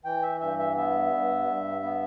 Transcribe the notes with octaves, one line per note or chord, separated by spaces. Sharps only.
E3 G5
E5
G2 E5
E5
B3 E5
G2
G2
B3